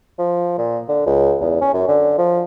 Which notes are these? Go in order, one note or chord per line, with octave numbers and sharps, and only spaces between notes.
F3
A#2
D3
C#2
E2
C#4
F#2
D3
F3